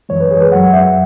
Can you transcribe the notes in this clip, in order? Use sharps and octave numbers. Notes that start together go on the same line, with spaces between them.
F#2 E3 G#3 C#5
B4
G#4
B4
F#2 F#3 F#5
E5